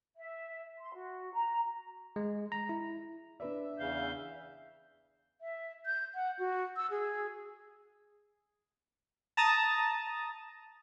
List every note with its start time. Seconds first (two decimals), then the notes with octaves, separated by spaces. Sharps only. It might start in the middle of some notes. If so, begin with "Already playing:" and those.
0.16 E5
0.79 C6
0.94 F#4
1.33 A#5
2.16 G#3
2.52 A#5
2.69 E4
3.40 D4 B4 D5 E5
3.79 E2 C#3 F5 G6
5.41 E5
5.86 G6
6.15 F#5
6.39 F#4
6.76 E6
6.91 G#4
9.37 A5 A#5 D#6 A6